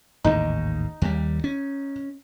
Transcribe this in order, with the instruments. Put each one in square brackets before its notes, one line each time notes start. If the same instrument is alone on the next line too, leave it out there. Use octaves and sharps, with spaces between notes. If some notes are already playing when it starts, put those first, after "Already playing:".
[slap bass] A1 D#2 G#2 [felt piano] D#4
[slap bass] D#2 G3
C#4